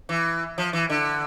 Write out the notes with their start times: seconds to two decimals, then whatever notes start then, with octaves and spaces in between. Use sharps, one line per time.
0.09 E3
0.58 F3
0.73 E3
0.90 D3